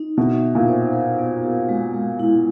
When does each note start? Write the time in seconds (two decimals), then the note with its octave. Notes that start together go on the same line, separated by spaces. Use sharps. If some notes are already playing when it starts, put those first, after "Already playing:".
Already playing: D#4
0.17 B2 E5
0.43 D#4
0.55 A#2
0.68 C5
0.93 A#4
1.19 B3
1.43 G4
1.69 G#3
1.94 G#3
2.20 E4